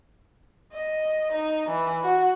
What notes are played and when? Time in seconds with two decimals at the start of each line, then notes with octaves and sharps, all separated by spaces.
0.73 D#5
1.33 D#4
1.70 E3
2.03 F#4